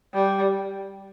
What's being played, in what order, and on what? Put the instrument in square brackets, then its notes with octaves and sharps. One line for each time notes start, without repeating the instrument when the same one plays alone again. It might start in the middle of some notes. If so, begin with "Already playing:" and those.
[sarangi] G3